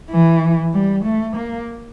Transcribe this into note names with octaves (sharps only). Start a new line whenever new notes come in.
E3
G3
A3
A#3